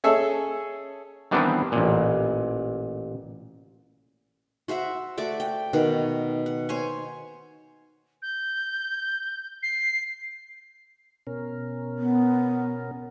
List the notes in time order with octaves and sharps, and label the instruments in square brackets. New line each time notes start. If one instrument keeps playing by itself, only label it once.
[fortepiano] C#4 G#4 A4 E5
[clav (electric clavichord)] D#3 E3 G3 B3 C4 D4
A1 A#2
[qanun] F#4 C5 E5 F#5
A3 F#4 D5 D6
G5
B2 D#3 F#5
F#5
C5 C#5 G#5 C#6
[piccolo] G6
C7
[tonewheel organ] B2 C#4 A#4
[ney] B3